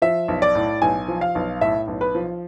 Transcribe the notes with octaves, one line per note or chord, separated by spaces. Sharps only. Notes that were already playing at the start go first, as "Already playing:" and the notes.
F3 E5
B1
D5
A2
B1 G#5
F3
F5
B1
A2 E5
B1
B4
F3